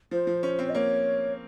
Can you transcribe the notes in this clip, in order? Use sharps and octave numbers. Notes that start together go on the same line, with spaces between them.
F3 C5
F3
C#4
C4
D#5
A#3 C#5